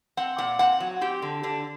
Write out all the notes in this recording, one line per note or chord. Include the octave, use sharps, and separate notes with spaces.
C4 F#5
A#2 F#5
C4 F#5
F#3
C4 G4
D3
D3 D4